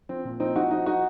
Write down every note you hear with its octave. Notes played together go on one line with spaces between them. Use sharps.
F3 C4
A#2
F3 C4 D#4
F3 D#4 F#4
F3 D#4 F#4
F3 D#4 F#4